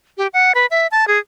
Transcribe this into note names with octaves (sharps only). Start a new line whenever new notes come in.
G4
F#5
B4
E5
A5
G#4